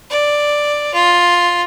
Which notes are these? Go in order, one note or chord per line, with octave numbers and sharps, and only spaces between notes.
D5
F4